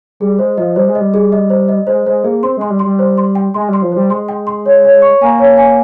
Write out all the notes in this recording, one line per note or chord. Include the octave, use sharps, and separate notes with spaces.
G3 G#4
G#3 C5
F3 D#5
G3 C5
G#3
D#5
G3
G#4
D#5
C5
D#5
G#3 C5
G#3 C5
A#3 G#4
C4 C6
G#3 C6
G3
C6
G3
C5
C6
G5
G#3 C6
G3 C6
F3
G3 C5
G#3 C6
G5
C6
C#5
C#5
C#6
A#3 G#5
C#5
G#5